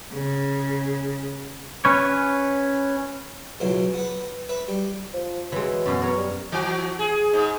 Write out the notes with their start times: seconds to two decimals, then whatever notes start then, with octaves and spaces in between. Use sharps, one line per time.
0.14 C#3
1.85 C#4 B4 C#5
3.60 C#2 B2 E3 F#3 G#3
3.94 B3 B4
4.49 B4 E5
4.68 G3
5.13 F3
5.52 E3 F#3 G#3
5.86 F#2 B2 C#4
6.02 B2 A#4 C#5
6.17 G3
6.52 E3 F#4
6.99 G#4
7.33 G#2